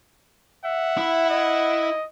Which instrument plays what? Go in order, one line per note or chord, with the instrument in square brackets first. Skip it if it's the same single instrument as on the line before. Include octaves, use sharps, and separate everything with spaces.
[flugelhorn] E5 [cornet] F#5
[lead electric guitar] E4
[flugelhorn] D#5